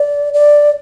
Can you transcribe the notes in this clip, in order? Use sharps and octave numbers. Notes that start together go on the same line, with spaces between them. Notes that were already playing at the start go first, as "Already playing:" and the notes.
Already playing: D5
D5